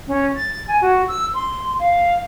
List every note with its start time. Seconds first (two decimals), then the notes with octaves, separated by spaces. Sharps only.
0.07 C#4
0.36 A6
0.68 G#5
0.82 F#4
1.08 E6
1.35 C6
1.79 F5